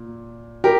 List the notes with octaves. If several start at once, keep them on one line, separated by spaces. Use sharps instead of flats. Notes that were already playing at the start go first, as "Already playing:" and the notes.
Already playing: A#2
G4 A#4